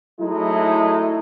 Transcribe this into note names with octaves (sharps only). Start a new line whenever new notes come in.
F#3 G#3 A3 D#4 E4